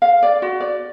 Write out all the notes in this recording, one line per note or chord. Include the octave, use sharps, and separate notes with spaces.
F5
D5
F#4
D5